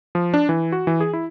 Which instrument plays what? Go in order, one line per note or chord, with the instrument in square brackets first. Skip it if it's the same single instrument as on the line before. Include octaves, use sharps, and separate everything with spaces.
[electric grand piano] F3
D4
E3
F#4
E3
G#4
E4